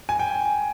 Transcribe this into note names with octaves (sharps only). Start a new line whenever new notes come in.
G#5
G5